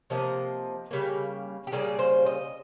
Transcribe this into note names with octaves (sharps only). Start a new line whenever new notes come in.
C3 F3 A#3 D#5
C#3 G3 A#3
G4
C#3 G3 A#3 G#4
C5
D#5